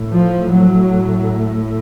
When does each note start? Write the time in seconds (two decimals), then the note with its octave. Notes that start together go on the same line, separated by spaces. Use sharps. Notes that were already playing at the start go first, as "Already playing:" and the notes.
Already playing: A2
0.12 F3
0.51 F#3